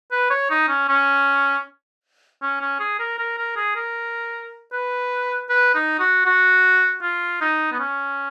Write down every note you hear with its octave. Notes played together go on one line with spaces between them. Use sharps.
B4
C#5
D#4
C#4
C#4
C#4
C#4
G#4
A#4
A#4
A#4
G#4
A#4
B4
B4
D#4
F#4
F#4
F4
D#4
B3
C#4